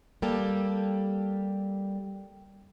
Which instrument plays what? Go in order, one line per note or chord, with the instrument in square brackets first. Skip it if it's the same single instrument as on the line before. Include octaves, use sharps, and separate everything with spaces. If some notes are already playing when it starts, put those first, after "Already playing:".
[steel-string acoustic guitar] G3 A#3 G4 A4